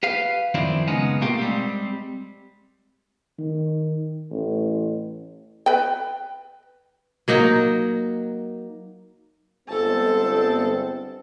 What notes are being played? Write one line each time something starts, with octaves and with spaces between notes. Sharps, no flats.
G4 B4 F5
F#2 D#3 F3 C4 D4 E4
C#3 G#3 B3 C#4 D#4
B2 A3 A#3 F4 G4
G3 G#3 C4
D#3
A1
B4 G5
F#3 A#3 D#4
G1 G#3 C4 A4 A5